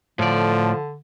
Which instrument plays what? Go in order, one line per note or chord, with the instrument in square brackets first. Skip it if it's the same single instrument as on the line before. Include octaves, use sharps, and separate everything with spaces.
[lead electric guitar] A2 D5 [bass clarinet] D3 [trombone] F3